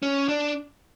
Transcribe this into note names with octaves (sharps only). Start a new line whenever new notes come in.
C#4
D4